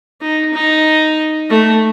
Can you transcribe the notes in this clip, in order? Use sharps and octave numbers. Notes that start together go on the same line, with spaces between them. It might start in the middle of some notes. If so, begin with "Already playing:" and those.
D#4
D#4
A3